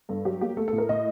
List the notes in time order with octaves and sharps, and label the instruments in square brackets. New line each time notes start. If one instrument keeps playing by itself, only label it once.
[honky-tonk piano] G2 A4
F#3 G4
A#3 G4
A3 A4
A4
A2
A#4
A2 D#5